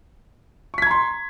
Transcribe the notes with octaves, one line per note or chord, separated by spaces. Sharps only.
A#5 C6 C#6 G#6 B6